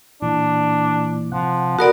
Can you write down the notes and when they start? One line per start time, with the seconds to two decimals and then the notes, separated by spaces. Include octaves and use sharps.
0.22 A#2 E3 D4
1.32 C3 F3 F#5
1.79 B3 F#4 A4 A#4 D5 A#5